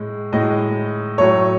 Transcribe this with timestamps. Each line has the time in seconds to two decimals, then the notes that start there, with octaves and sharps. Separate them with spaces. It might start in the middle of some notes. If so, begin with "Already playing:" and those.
Already playing: A2 G#3
0.33 A2 G#3 D#5
1.18 A2 F#3 A3 C#5